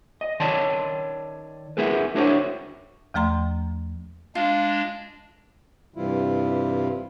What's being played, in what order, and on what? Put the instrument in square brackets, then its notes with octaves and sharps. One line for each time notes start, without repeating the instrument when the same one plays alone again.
[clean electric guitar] D#5
D#3 C#5 D5 A5 C6
B3 E4 G#4 A#4 B4
D4 E4 F#4 A#4 C5 C#5
[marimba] E2 F3 A3 A#5 C6
[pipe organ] G#3 D4 [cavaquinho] F4
[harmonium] G2 C3 E3 G3 E4 F4